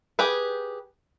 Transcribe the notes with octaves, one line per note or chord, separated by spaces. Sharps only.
G4 G#4 B4